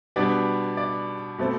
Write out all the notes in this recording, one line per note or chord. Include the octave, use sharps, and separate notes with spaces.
B2 G3 B3 D4 D5
D5
B2 A3 C4